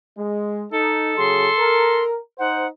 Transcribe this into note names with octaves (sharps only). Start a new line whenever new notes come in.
G#3
D#4 A4
C#3 F#3 G#4 C6
A#4
D#4 C5 F#5